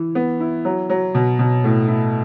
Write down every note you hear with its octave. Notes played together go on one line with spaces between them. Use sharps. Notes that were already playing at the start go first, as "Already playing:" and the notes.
Already playing: E3
B3
E4
F#3
F#3
B2
B2
A2
E4